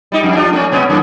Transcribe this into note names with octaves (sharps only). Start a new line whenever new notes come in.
G3 D#4 G4
F2
D4 F4 G4
A3 C#4
B2 B3 C#4
F#2 E3 A#3